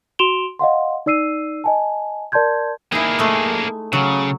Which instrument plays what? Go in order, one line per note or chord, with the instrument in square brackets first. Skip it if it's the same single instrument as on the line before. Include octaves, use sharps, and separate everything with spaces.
[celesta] F#4 C6 D7 E7 F7 G7
D#5 F5 F#5 C6
D#4 D5 E6 C7 D#7
D#5 G#5 A5
A#4 D5 A5 C6 G6 G#6
[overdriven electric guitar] A#3 G#4 [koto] D#4 E4
[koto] G#3 A3
[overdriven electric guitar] C#3 [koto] F#3